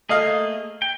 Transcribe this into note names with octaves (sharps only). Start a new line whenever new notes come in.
A3 A#3 G#4 A4 D#5 F5
G5